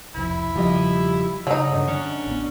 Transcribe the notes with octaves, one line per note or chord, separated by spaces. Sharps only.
E1 C2 F2 E4
E1 C#3 F3 G3 G4 D#5
C#3 F#3 D#4
G2 D3
D3 C#4 D4
A1 B3